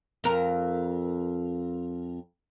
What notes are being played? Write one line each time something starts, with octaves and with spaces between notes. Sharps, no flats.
F2 A#4